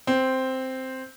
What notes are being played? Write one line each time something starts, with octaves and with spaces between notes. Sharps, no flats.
C4